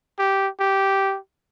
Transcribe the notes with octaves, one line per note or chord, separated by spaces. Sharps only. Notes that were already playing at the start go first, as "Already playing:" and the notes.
G4
G4